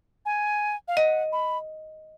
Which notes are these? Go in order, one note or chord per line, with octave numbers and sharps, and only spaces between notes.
G#5
F5
D#5 F#5
B5